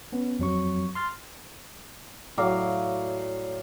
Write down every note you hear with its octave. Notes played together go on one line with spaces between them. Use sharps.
B3 C#4
F2 F#3 C#6
C6 F6 A6
A2 F#3 D5 F5